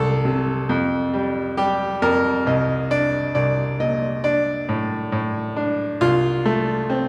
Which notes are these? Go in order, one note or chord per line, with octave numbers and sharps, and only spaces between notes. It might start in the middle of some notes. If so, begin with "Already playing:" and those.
Already playing: C2 A4
C3
F2
G3
G3 G4
F2 A#4
C2 D#5
D4 D5
C2 D5
A#2 D#5
D4 D5
A2
A2
D4
C2 F4
A3
C4